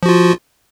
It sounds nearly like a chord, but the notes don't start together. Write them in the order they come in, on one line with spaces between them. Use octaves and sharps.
F3 F#4 F4